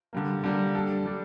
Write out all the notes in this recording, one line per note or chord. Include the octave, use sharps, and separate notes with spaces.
D3 G3 A#3
D3 G3 A#3
G3 D4 A4
G3 D4